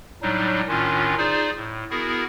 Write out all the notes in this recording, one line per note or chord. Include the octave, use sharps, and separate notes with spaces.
A2 F#3 G3 D4 D#4
A2 D#3 C#4 D4 F4
D#4 F4 G#4 C5 D5
A2
B3 E4 F#4 G#4 A#4